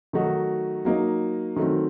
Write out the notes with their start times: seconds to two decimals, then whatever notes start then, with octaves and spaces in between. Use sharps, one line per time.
0.13 D#3 F#3 A3 D#4 F#4
0.85 F#3 A#3 D#4
1.56 D#3 F#3 A3 C4